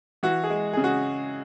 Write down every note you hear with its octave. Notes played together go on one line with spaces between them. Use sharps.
E3 F#4
G#4
G#3
C#3 G#4
F#4